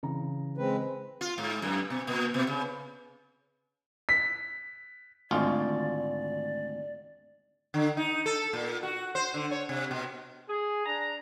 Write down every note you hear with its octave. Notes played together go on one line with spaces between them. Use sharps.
C#3 E3 A#5
G#3 C4 B4
F4
G#2
F#2
B2
A#2
B2
C#3
B6
G#1 D2 F4 D5
D3
D#4
A4
A#2
F#4
C5
D3
C#5
C3
B2
G#4
D4 A#5